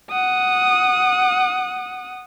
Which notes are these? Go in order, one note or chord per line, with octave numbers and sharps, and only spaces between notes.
F#5 D#6